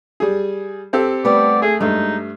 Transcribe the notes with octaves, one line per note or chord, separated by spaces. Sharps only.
G3 G#4
C4 G4 A4
G3 A3 B3 D5
A3 G#4
G2 G#3 A3 D#4